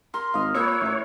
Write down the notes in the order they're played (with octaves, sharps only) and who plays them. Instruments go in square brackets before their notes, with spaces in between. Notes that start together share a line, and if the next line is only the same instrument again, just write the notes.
[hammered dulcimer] A#4 [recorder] C6
[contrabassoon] G#1 [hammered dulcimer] D#5 F5
[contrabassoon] A#2 [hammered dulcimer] A#4 B4 B5 [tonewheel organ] C#5 [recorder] E6
[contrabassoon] A1 [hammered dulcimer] E4 A#4